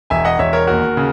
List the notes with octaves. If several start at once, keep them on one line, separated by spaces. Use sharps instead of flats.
E1 E5 G#5
D#5 F#5
E1 C#5 E5
A#4 C#5
D#2 F#4 A#4
C#3